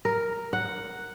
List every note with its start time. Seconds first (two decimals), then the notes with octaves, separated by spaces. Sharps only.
0.05 A#4
0.53 F#5